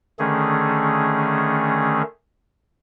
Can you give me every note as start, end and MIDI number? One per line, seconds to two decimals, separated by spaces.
0.19 2.02 50
0.19 2.02 51
0.19 2.02 57
0.19 2.02 61
0.19 2.02 68